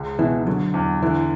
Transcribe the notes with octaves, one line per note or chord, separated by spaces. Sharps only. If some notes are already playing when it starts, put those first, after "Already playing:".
Already playing: C#2 G#3
B2 E3
D3 F#3
E2
D3 E3